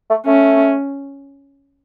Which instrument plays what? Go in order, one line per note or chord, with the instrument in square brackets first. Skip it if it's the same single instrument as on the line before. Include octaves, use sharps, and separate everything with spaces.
[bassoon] A3
[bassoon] A3 [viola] C#4